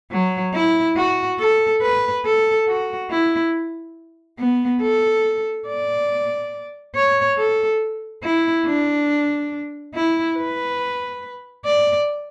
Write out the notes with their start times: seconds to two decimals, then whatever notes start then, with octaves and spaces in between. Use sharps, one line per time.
0.12 F#3
0.54 E4
0.97 F#4
1.39 A4
1.82 B4
2.25 A4
2.68 F#4
3.10 E4
4.39 B3
4.81 A4
5.67 D5
6.95 C#5
7.37 A4
8.23 E4
8.66 D4
9.94 E4
10.37 B4
11.65 D5